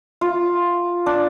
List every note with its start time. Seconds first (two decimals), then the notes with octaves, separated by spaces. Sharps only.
0.21 F4
1.06 D4